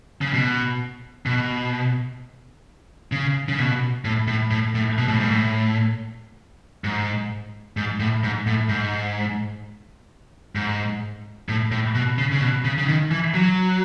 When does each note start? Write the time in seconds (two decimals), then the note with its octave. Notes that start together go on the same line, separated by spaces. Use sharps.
0.21 C#3
0.34 B2
1.26 B2
3.12 C#3
3.49 C#3
3.59 B2
4.05 A2
4.28 A2
4.51 A2
4.75 A2
4.98 B2
5.08 A2
5.20 G#2
5.31 A2
6.84 G#2
7.77 G#2
8.00 A2
8.24 G#2
8.46 A2
8.69 G#2
10.55 G#2
11.49 A2
11.72 A2
11.95 B2
12.18 C#3
12.32 C#3
12.41 B2
12.64 C#3
12.78 C#3
12.88 D#3
13.11 E3
13.34 F#3